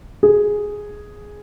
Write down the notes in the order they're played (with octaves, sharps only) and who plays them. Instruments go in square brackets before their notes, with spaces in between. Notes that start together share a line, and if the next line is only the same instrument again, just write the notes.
[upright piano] G#4